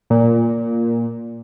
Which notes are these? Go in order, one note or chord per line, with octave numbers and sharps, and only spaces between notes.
A#2